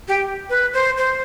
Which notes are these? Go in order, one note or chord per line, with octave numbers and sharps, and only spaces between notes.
G4
B4
C5
C5